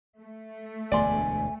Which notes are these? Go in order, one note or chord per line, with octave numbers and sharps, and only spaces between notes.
A3
E1 D2 D3 D5 G#5 C6